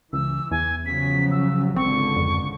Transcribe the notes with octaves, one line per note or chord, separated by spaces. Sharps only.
C#2 E3 E6
E2 G#5
C#3 F3 F#3 B6
E6
G#1 C#2 D3 C4 C#6
F2